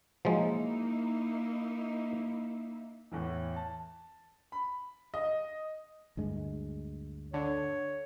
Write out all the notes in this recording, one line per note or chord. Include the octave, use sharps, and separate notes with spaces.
F3 F#3 G#3 A#3 D#4 E4
E2 A2 E3
A5
B5
D#5
D2 G2 G#3
D3 C#5